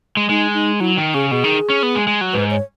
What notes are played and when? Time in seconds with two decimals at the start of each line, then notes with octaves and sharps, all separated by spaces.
0.17 G#3
0.29 G#3 D#4
0.54 D#4
0.80 F#3 E4
0.97 D#3
1.14 C#3 G#4
1.31 B2 G#4
1.44 D#3
1.70 C#4
1.83 B3
1.95 G#3
2.07 G#3
2.21 F#3
2.33 G#2 B4
2.51 C#5